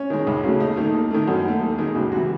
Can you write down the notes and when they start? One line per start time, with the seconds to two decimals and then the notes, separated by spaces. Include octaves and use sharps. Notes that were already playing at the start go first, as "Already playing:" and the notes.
Already playing: C#4
0.10 D#3 G#3
0.27 C#2
0.43 C#3 F#3 A3
0.60 D#2 D#4
0.77 D#3 A3
0.94 D#2
1.11 D#3 A3
1.27 F#2 D#4
1.45 D#3 A3
1.61 D#2
1.78 D#3 G#3
1.95 C#2 F#4
2.11 C3 E3 F#4